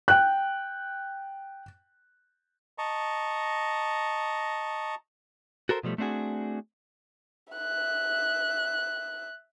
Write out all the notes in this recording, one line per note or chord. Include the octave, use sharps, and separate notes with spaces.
G5 F#6
D#5 A5 A#5 C#6
F#4 A4 A#4 C5
B2 F3 G3 A3
A3 C4 D4 F#4 G#4
E5 F#6